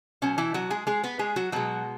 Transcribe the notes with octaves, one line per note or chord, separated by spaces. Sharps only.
B2 F#3 C#4
E3 E4
F#3 F#4
G#3 G#4
G#3 G#4
B3 B4
G#3 G#4
F#3 F#4
B2 F#3 G#3 F#4